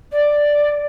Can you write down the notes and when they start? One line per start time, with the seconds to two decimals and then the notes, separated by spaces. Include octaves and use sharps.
0.11 D5